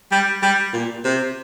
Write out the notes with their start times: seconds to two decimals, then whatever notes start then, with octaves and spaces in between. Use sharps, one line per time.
0.12 G3
0.42 G3
0.73 A#2
1.05 C3